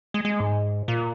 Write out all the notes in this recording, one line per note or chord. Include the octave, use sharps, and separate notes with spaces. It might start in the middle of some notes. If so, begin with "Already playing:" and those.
G#3
G#3
G#2
A#2